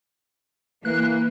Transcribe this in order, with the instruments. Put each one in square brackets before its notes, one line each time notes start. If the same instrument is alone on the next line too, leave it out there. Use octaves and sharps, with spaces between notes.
[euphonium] E3 [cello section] A#3 [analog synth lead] F#6